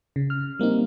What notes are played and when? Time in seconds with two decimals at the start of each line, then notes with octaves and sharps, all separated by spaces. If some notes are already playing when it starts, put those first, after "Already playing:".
0.16 C#3
0.30 F6
0.59 G3 A#3 C4 D#4